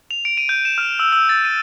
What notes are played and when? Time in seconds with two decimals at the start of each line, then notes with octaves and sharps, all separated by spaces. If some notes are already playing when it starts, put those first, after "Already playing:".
0.11 F7
0.25 D7
0.37 D#7
0.49 G6
0.65 E7
0.78 F6
0.99 E6
1.12 E6
1.29 A6
1.45 D#7